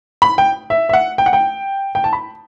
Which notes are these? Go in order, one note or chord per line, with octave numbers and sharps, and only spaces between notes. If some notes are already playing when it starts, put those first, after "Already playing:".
B5
G5
E5
E5
F#5
G5
F#5
G5
G5
A5
B5